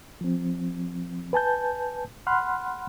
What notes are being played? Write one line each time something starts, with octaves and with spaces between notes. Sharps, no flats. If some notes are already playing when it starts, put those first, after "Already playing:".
F3 C4
B4 G#5 A5 G6
F#5 B5 C6 F6 F#6